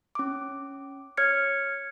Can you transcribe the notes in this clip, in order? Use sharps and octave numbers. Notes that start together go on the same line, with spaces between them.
C#4 D6
C#5 F6 G#6 C#7